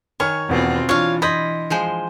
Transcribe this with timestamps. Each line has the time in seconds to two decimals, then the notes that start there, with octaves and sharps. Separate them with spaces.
0.20 D#3 C#5 G#5 C#6 F6
0.49 E2 B2 B3 C4 F4
0.89 E3 D4 F4 C#5 F5
1.22 D#5 B5 C6 G6 G#6
1.70 F3 G#3 C5